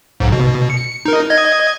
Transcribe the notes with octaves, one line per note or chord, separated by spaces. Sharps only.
B1 G#2
B2
C#7
D#4 A#4
D#5 G#6